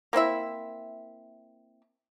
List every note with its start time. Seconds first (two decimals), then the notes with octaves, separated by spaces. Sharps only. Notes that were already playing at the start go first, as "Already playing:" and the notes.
0.13 A#3 C4 E4 E5